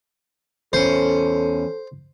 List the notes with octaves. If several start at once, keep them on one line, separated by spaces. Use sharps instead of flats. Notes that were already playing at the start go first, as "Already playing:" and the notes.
E2 C#4 A4 C5